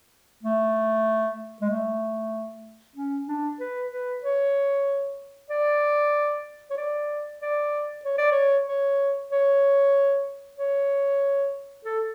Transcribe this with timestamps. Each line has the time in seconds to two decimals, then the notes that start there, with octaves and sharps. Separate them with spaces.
0.43 A3
1.61 G#3
1.70 A3
2.96 C#4
3.28 D4
3.60 B4
3.92 B4
4.24 C#5
5.50 D5
6.70 C#5
6.77 D5
7.41 D5
8.05 C#5
8.18 D5
8.32 C#5
8.68 C#5
9.32 C#5
10.58 C#5
11.85 A4